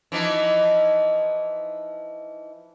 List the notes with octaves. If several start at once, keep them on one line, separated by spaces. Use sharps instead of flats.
E3 F3 D#4